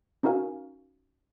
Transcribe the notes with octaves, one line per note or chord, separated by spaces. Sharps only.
C#4 D#4 F#4 A#4 F5 G#5